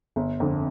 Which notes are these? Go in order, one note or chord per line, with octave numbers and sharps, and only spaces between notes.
G1
F2 D3